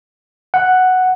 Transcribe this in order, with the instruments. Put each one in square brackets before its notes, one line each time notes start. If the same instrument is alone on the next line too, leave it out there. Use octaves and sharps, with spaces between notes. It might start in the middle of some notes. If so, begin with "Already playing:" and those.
[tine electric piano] F#5